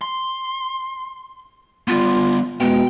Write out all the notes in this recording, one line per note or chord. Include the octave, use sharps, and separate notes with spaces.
C6
G3 B3 F4
B2 G#3 G5